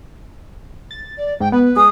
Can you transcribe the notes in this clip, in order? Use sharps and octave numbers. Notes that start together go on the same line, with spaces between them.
A6
D5
G#2 G5
B3 B4
G#3 D#6